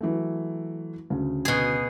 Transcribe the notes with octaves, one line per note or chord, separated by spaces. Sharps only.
E3 F#3 A3
D2 C#3
B2 G#4